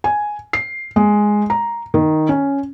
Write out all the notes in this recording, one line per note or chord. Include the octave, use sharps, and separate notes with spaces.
G#5
C7
G#3
A#5
D#3
C#4